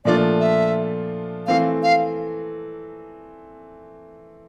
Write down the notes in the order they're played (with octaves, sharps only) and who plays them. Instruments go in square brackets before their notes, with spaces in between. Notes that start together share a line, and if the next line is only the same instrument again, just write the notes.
[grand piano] A#2 F3 A3 D4 F4 [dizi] D5
[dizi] E5
[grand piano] E3 A3 C4 [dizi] F5
[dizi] F5